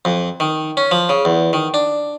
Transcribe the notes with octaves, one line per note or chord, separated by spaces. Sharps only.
F2
D#3
C#4
F3
C#3
E2
D#3
D4